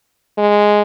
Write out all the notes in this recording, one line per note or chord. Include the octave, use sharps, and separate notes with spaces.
G#3